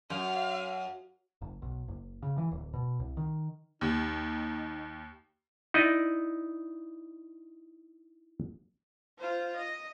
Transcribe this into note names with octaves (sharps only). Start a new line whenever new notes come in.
F#2 F5
F#1
B1
F#1
C#3
E3
D1
B2
C2
D#3
D#2 D#4
D#4 E4 D5 D#5
F4 C5
D#5